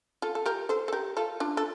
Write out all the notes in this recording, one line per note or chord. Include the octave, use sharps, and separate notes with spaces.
F4 A4
A4
G4 A#4
A4 C5
A4
G4 A#4
F4 A4
D4 F4
A4